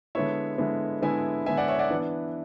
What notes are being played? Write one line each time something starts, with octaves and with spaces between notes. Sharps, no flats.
D3 G#3 B3 E4 C#5 E5
D3 G#3 B3 E4
D3 G#3 B3 E4 E5 G#5
D3 G#3 B3 E4 E5 G#5
D5 F#5
C#5 E5
D5 F#5
E3 B3 D4